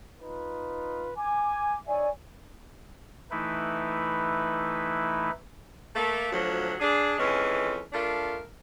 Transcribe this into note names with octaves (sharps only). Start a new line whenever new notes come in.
D#4 F4 B4
G#5 D6
D#4 C#5 D5 E5 G#5
E3 A3 D#4 E4 B4
A3 A#3
D2 F3 F#3
D4 G#4
F2 E3 G#3 C#4
A3 D4 F4 A#4